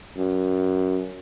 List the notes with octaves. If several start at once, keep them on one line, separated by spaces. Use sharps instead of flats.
F#2